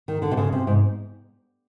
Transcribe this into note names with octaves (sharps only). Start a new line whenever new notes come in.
D#3
D3
C3
C#3
C3
G#2